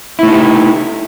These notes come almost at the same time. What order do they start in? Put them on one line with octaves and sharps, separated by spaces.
E4 A3 D#4 G4